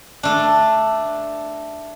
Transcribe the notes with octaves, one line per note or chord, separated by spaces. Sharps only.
A3 D4